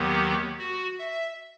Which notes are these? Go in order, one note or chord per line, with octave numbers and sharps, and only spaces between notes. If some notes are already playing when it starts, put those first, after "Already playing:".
Already playing: D#2 D#3 F#3 B3 G4
F#4
E5